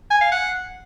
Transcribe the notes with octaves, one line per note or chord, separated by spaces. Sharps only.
G#5
F5
F#5